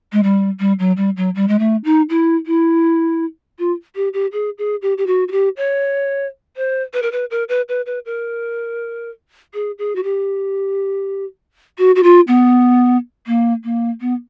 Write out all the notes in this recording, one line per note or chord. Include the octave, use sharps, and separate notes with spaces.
G#3
G3
G3
F#3
G3
F#3
G3
G#3
A3
D#4
E4
E4
F4
G4
G4
G#4
G#4
G4
G4
F#4
F#4
G4
C#5
C5
B4
A#4
B4
A#4
B4
B4
B4
A#4
G#4
G#4
F#4
G4
F#4
F#4
F4
B3
A#3
A#3
B3